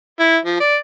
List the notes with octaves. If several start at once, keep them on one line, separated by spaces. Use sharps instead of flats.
E4
F3
D5